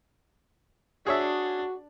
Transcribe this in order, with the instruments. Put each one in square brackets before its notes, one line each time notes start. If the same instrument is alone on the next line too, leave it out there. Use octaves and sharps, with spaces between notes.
[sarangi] D4 [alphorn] F#4 [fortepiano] G#4 C#5 E5